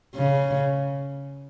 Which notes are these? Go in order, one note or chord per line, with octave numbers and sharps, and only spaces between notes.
C#3